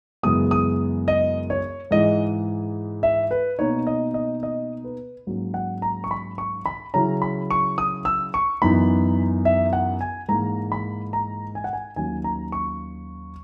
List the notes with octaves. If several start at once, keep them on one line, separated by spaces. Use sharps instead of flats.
F#2 C#3 E3 G#3 B3 D#6
D#6
D#5
C#5
G#2 E3 G#3 D#5
E5
B4
B2 A#3 D#4 C#5
D#5
D#5
D#5
B4
G#2 F#3 A#3 C#4
F#5
A#5
C#6
B5
C#6
B5
C#3 F#3 C#4 E4 A#5
B5
C#6
D#6
E6
C#6
F#2 E3 B3 D#4 B5
E5
F#5
G#5
G#2 E3 A#3 A#5
B5
A#5
G#5
F#5
G#5
D#2 D#3 F#3 A#3 C#4 G#5
A#5
C#6